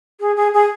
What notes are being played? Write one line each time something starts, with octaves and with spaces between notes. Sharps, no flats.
G#4
G#4
G#4